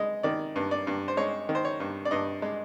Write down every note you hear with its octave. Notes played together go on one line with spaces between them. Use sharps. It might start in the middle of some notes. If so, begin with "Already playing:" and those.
Already playing: G#3 D#5
D#3 D5
G2
D5
G2
C5
G#3 C#5
D#3
C5
C#5
G2
D5
G2 D#5
G#3